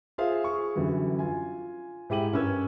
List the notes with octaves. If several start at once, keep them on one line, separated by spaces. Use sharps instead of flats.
F4 G#4 C5 E5 F5
G#4 C#6
F#2 D3 E3 F#3 G3
F4 G#5
G#2 E4 G4 D#7 F#7
G2 C#4 A#4 B4 E6 G#6